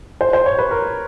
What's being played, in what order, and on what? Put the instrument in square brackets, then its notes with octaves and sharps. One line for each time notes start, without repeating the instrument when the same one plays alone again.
[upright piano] C5
C5
C#5
B4
A#4